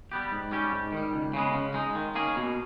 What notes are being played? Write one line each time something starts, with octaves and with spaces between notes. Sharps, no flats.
G3 B3 G4
G#2
G3 C#4 G4
G#2
D#3 G3
C#2
C#3 G#3 B3
C#3
G#3 D#4
D#3
A#3 C#4 G#4
B2